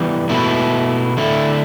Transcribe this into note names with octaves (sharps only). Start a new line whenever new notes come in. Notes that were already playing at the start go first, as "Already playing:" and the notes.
Already playing: E3 G3 B3
B2 A3 E4
D3 A3 E4